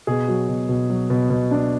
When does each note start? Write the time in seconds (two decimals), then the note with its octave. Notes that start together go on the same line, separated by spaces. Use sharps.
0.07 B2 G#4
0.28 F#3
0.49 B2
0.69 B2
0.90 F#3
1.10 B2
1.30 B2
1.51 D4